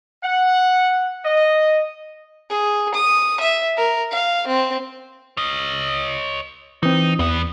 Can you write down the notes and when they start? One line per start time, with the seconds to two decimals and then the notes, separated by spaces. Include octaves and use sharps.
0.22 F#5
1.24 D#5
2.50 G#4
2.94 D#6
3.40 E5
3.77 A#4
4.11 F5
4.47 C4
5.37 C#5 D#5
6.83 E3 C4 D#4
7.19 E2 E3 B3